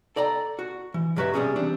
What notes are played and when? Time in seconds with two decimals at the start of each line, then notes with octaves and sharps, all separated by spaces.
0.16 A4 D5 G5 A#5
0.59 F#4
0.94 E3
1.16 C2 G2 F#3 G4 B4 E5
1.34 C3 F3 G3 C#4 G#4
1.56 E3 G3 C4 D4